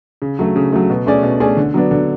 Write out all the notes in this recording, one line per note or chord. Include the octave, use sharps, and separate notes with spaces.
C#3
F#3 A3
C#3
F#3 A3
B2
A3 C#4 G#4 D5
B2
A3 C#4 G#4 D5
D3
F#3 B3 D4
D3